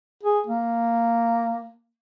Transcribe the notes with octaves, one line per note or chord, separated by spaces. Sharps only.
G#4
A#3